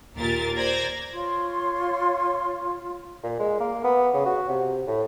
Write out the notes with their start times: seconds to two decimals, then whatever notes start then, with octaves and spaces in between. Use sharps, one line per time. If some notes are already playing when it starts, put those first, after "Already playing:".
0.18 D#2 A#2 F4 A#4 A6
0.57 C5 D5 A#5 G#6 A#6
1.13 F4 C#5 C6
3.24 A#2
3.39 G#3
3.60 A#3
3.84 B3
4.14 C#3
4.25 F#4
4.49 C3
4.87 A2